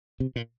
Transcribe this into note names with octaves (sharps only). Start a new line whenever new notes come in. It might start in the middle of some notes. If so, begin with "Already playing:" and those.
C3
A#2